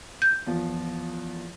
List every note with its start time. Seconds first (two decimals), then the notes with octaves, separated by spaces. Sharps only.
0.22 G6
0.47 E2 F3 F4